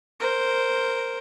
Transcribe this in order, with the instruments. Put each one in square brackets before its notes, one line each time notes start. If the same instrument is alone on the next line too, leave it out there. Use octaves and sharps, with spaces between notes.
[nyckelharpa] A#4 C5